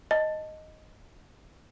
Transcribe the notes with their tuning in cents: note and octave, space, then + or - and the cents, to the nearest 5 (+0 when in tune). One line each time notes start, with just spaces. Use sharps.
D#5 +0 A5 +0